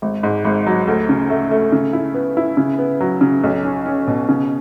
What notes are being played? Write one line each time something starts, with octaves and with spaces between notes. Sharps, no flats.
G#1
G#2
G#1
F#3
D2
C#3
A3
A3
C#3
E4
B3
E4
C#3
B3
F#3
C#3
B1
C#4
C#4
B2
C#3